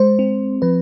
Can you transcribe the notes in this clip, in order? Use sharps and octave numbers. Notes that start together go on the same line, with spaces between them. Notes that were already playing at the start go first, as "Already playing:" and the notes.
Already playing: G#3 C5
C4
F3 B4